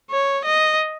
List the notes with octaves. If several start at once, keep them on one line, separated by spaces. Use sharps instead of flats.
C#5
D#5